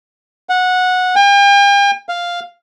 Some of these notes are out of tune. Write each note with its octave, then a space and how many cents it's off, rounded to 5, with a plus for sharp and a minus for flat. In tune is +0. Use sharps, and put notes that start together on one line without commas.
F#5 -15
G5 +45
F5 +0